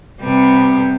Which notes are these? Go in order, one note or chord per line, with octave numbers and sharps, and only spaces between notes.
C3 G3 B3